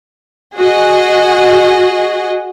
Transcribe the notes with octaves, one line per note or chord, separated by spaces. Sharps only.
F#4 G#4 D#5